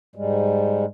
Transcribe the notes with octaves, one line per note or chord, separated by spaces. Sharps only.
G#2 G3 G#3